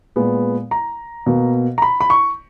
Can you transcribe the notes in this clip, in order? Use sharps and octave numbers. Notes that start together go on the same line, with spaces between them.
A#2 G#3 B3
A#5
B2 A#3
A#5
B5
B5
C#6